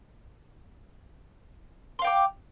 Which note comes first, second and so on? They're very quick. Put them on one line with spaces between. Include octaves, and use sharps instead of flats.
C6 F5 G5 D6